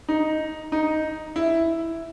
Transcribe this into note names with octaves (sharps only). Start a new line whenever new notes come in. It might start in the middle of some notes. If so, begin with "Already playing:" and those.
D#4
D#4
E4